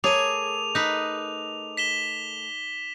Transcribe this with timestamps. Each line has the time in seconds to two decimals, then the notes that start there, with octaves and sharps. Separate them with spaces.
0.04 A3 G#4 A#4 C#5 D6 D#7 F7
0.75 D#4 B4
1.77 B6 E7 G7